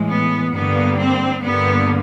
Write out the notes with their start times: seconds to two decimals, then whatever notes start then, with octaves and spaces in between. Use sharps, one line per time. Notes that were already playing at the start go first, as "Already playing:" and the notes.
Already playing: A2 E3 G#3
0.09 B3
0.53 G2 D3 G3 A#3 B3
0.98 C4
1.43 G2 D3 G3 A#3 B3